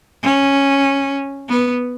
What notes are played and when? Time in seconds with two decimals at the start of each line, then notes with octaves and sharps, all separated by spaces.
0.23 C#4
1.48 B3